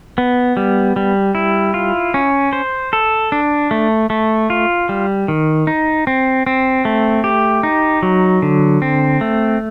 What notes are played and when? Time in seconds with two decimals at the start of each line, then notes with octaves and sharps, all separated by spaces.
0.18 B3
0.57 G3
0.96 G3
1.35 E4
1.74 F4
2.14 C#4
2.53 C5
2.93 A4
3.32 D4
3.71 A3
4.10 A3
4.50 F4
4.89 G3
5.28 D#3
5.67 D#4
6.07 C4
6.47 C4
6.85 A3
7.24 G4
7.63 D#4
8.02 F#3
8.42 D3
8.82 C4
9.21 A3